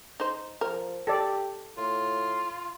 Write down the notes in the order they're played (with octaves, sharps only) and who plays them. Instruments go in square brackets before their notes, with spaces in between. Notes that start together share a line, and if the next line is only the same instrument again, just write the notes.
[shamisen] D#4 C5
[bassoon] F3 [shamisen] A#4
[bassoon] G4 [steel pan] A4 D5
[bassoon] A2 [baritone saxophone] F4